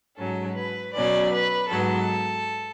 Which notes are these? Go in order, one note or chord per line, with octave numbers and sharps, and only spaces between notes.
G#2 F#3 C#4 A4
B4
B2 F#3 C#4 D5
B4
G#2 F#3 B3 A4